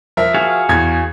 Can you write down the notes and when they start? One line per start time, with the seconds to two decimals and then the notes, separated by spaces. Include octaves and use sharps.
0.17 F3 A#4 E5
0.34 F#4 G#4 F5
0.69 E2 G#6